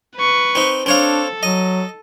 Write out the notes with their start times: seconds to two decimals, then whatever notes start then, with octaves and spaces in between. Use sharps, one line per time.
0.16 B4 C#6
0.55 C4 D#4
0.86 C4 D4 A4 C#5 F5
1.43 F#3 D#5